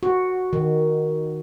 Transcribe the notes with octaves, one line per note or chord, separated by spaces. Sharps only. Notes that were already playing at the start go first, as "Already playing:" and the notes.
F#4
D#3